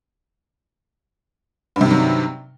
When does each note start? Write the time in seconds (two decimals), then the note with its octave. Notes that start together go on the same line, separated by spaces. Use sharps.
1.76 G2
1.81 C3
1.86 D#3
1.90 F#3